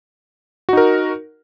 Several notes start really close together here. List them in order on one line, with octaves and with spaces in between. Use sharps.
F#4 D#4 A#4